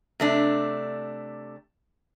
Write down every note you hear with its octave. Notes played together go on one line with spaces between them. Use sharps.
C3 A3 D4